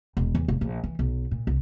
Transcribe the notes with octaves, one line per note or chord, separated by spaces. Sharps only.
E1
E2
E1
A#1
E3
B1
A#2
C2